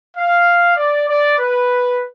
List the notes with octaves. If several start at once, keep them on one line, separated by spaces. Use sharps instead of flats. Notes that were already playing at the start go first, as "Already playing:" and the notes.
F5
D5
D5
B4